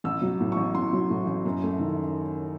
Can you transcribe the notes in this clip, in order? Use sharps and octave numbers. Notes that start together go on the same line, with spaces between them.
A1 E6
F#3
A2
A1 C#6
A1 C6
F#3
A2
A1
F#2
A3
D#3